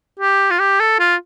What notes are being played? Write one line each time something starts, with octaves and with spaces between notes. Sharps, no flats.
G4
F4
G4
A4
F4